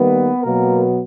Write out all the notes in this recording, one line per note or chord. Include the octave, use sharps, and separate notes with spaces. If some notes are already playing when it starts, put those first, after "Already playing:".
Already playing: D#3 G3 A#3 B3 B4
B2 F#3 A#3 B3 A#4